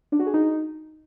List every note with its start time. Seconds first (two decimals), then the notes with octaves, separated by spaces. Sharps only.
0.12 D4
0.19 F#4
0.27 G#4
0.34 D#4